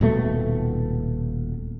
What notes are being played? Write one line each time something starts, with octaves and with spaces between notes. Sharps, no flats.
D#1 B2 A3